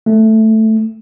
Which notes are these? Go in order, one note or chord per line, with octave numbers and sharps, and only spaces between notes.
A3